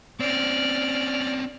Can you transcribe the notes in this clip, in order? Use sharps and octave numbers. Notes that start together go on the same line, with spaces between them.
C4 C#4 D5 F6